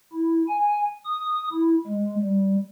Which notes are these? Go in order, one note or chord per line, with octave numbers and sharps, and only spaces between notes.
E4
G#5
D#6
E4
G#3
G3